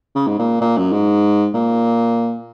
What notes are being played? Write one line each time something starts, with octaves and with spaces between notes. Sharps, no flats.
C#3
G#2
A#2
A#2
F#2
G#2
A#2